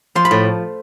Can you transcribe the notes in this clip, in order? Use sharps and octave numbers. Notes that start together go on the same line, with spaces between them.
F3 C6
B5
A2